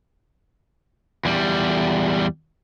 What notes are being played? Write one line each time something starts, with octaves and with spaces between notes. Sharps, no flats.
E2 G3